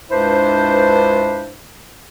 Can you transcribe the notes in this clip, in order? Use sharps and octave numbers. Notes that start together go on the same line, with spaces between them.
C#2 G2 D4 E4 B4 C5